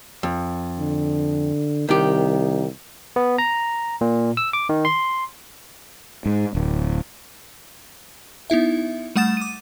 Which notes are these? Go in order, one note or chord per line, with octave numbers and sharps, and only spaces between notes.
F2
D3
C2 D#3 G4
B3
A#5
A#2
E6
D6
D#3
C6
G#2
D1
B3 D#4 E4 E5
G3 A3 F#5 D#6 A6 E7
D6 D#7